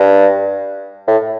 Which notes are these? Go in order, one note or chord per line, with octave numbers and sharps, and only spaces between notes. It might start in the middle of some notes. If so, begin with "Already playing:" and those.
Already playing: G2
A2